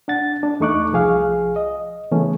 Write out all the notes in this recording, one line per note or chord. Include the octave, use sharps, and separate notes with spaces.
D4 F#5 A6
D4
E2 A3 D#4 C#6 D6 F#6
C2 F3 G#4 F5
D#5
C#3 E3 A3 B3 C#4